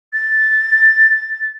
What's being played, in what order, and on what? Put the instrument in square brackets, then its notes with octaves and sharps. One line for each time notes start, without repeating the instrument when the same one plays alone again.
[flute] A6